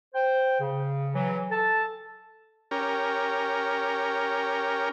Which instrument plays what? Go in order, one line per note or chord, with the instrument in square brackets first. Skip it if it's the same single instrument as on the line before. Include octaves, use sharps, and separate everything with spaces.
[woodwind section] C5 G5
C#3
E3 F#3
A4 A5
[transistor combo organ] C#4 G4 A#4